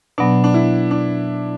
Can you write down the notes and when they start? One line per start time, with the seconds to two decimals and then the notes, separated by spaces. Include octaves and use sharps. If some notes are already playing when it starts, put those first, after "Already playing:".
0.18 B2 F#3 B3 D4
0.44 D4
0.54 E4
0.91 D4